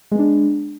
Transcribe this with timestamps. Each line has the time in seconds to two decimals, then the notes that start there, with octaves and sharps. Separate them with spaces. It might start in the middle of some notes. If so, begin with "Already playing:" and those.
0.11 G#3
0.15 B3
0.19 D4